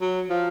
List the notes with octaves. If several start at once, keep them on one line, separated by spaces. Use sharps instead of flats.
F#3
F3